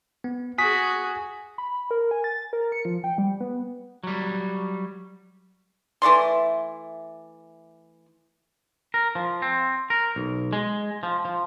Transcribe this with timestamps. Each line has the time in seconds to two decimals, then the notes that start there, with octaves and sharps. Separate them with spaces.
0.24 B3
0.58 F#4 G#4 G#5 D#6 B6
1.58 B5
1.91 A#4
2.11 G#5
2.24 A6
2.53 A#4
2.72 C#7
2.85 F3
3.04 G5
3.18 G3
3.40 B3
4.03 F#3 G3
6.02 E3 A3 D5 C6
8.94 A#4
9.15 F3
9.42 C4
9.90 A#4
10.16 B1
10.53 G#3
11.03 F3
11.25 F3